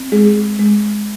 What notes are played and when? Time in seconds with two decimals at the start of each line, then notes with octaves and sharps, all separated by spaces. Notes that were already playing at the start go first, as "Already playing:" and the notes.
Already playing: C4
0.12 G#3 G#4
0.59 G#3